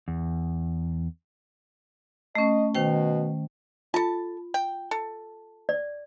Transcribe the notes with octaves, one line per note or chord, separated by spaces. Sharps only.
E2
A3 C#4 D#5
B2 D#3 C5 G5
F4 A4 A5
G5
A4
D5